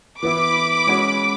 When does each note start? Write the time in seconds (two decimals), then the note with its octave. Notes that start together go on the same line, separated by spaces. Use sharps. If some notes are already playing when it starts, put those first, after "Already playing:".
0.22 E3 B3 E4 B5 D6
0.87 G#3 C#4 F#4 C#5